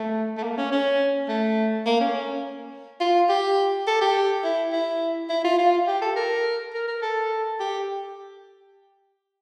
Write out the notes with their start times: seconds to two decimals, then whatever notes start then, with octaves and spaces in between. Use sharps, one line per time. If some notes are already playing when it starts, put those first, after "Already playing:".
Already playing: A3
0.37 A3
0.43 A#3
0.58 C#4
0.72 C#4
1.28 A3
1.86 A#3
2.00 C#4
3.01 F4
3.29 G4
3.87 A4
4.01 G4
4.44 E4
4.72 E4
5.30 E4
5.44 F4
5.58 F4
5.87 G4
6.02 A4
6.16 A#4
6.74 A#4
6.88 A#4
7.02 A4
7.60 G4